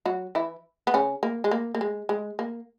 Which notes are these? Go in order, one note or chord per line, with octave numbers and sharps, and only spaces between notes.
F#3 F#4
E3 E4
B3
C#3 C#4
A#3
G#3
A#3
A#3
G#3
G#3
A#3